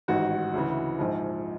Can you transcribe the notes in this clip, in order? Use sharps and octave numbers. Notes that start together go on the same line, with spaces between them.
A1 G#2 D#3 F#4
D2 C#3 E3
A#1 G#2 F3